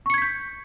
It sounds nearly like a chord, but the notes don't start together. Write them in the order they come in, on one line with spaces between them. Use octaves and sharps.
C#6 C#7 G#6 B6 G6